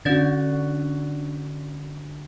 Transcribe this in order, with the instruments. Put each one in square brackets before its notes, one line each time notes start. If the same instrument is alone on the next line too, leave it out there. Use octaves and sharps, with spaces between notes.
[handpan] D3 F#4 [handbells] C#4 D5 A6